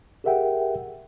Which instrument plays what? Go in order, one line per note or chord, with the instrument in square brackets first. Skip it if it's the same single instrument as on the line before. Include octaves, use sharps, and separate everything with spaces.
[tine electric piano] G4 G#4 A#4 E5 F#5 G5